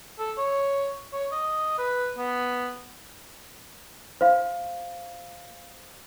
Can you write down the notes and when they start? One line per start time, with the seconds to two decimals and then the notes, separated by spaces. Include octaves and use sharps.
0.19 A4
0.38 C#5
1.13 C#5
1.32 D#5
1.78 B4
2.18 B3
4.21 C5 F5